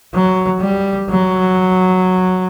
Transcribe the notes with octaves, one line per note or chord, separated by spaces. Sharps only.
F#3
G3
F#3